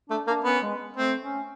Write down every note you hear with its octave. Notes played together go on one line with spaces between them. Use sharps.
A3 D4
A#3 D4
B3 C#4
G#3
A3 C4
C#4